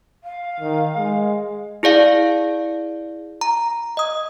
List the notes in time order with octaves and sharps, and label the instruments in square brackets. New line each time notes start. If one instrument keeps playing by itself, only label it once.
[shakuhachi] F5
[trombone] D#3
G#3
[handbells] E4 G#4 D5 F5
A#5
D#5 D#6